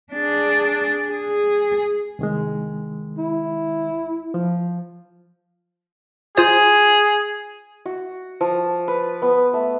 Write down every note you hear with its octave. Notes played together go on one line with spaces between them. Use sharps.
D4 G#4
G#4
C2 D#3 G#3
E4
F3
F4 G#4 C5 D#6
F#4
F3
B4
B3
A3